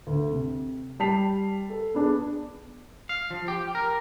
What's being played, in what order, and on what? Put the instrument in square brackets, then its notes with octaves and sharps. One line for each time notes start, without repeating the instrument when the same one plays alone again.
[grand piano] D2
C3
G3 A5 B6 C7 F7
A4
B3 D4 G#4
[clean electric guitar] F5
F3
G4
A#4